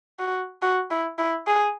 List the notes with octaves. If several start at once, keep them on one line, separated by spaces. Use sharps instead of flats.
F#4
F#4
E4
E4
G#4